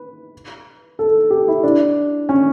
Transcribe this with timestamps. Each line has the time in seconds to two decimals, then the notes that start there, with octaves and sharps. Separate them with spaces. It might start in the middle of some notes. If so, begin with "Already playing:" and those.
Already playing: B4
0.99 A4
1.30 G4
1.48 E4
1.64 D4
2.29 C#4